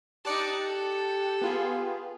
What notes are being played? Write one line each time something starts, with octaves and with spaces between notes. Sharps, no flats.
D#4 G4 D5 A5 F#6 C#7
A4
B3 F4 G#4